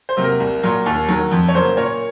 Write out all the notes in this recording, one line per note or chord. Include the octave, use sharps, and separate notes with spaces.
C5
C3 F#3 A#3
A#4
C2
A#2 F#3 A#3
D#2
D#3 F#3
F2
C#5
C#3 F#3 A#3 C5
A#2 A#4 C#5